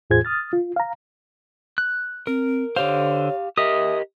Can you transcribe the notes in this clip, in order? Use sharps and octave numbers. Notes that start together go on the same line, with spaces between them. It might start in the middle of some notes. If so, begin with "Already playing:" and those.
E2 A2 F4 G#4 C5 G#6
D#6 F6 A6
F4
F5 A#5
F#6
C4 A#4
D3 G4 C5 C#5 F5
G4 A#4 D#5 E5 D#6